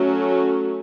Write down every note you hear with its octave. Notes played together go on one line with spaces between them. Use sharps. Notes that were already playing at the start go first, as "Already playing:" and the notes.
Already playing: F#3 A3 C#4